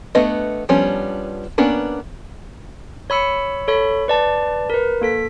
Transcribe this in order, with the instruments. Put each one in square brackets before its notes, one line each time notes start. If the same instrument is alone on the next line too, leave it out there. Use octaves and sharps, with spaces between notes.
[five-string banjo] A3 B3 D4 B4 D#5
F3 G3 B3 C#4 D4
A#3 B3 C#4 D4 B4
[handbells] C#5 B5 E6 C#7
A4 C#5 B5
B4 D5 A5
A#4 B4
A#3 A4 B6